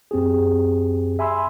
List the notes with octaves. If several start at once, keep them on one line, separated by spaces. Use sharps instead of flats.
F#2 C4 G4 G#4
E5 G#5 B5 C6 E6